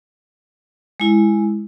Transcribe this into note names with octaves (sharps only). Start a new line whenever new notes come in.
G#3 E4